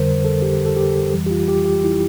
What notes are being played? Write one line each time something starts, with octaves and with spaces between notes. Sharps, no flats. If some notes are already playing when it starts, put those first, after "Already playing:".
Already playing: F2 D3 G3 A#4 C5
A4
G4
A4
G4
F2 E3 G3
G4
F4
G4
G4
E4